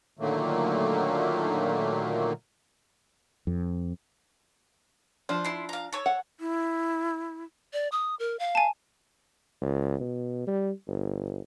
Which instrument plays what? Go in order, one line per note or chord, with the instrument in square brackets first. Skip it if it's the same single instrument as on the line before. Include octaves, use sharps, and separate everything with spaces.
[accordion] A#2 D3 D#3 F#3 A3 A#3
[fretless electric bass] F2
[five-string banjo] F3 D4 [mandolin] C5
[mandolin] E4 C6
F5 A#5
A4 C#5
[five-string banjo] F#5
[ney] E4
[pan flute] D5
D#6
A#4
F5
[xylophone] G#5 A5
[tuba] C#2
B2
G3
G1